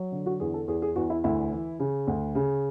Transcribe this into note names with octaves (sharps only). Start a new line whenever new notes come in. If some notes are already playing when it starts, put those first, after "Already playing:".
Already playing: F#3
D3
F#4
E2 G#4
A4
E2 G#4
G#4
E2 F#4
E4
D2 E4
E3
C#3
D2
C#3